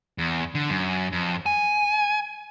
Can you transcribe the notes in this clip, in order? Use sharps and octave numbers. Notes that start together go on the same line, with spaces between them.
E2
D3
F#2
F2
G#5